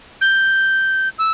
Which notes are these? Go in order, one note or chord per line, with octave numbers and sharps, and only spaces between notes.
G6
E6